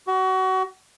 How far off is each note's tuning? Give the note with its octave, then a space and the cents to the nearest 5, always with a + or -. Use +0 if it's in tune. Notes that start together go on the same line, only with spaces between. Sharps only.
F#4 +25